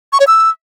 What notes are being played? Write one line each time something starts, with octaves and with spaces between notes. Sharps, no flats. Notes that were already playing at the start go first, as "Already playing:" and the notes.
C#6
C#5
E6